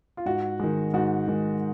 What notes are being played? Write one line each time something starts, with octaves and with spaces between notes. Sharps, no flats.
F4
G#2 F#4
D#3 G#3
G#2 F#4
D#3 G#3